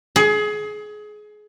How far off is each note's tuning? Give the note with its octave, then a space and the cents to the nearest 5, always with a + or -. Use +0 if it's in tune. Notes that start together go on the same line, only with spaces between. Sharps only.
G#4 +25